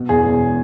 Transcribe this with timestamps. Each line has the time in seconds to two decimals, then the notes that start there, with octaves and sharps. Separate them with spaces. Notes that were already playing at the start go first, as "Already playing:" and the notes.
Already playing: B2
0.09 E2 G#4
0.25 E1